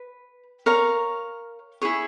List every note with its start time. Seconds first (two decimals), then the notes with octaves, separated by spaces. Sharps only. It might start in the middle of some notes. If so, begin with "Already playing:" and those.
Already playing: B4
0.66 A#4 C#5 F5 A#5
1.82 E4 G#4 C#5